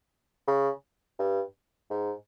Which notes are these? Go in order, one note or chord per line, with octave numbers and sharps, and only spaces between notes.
C#3
G2
G#2